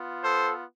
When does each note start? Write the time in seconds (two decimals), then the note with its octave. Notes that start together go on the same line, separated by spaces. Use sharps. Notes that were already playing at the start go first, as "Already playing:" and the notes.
Already playing: B3 F4
0.22 A4 C5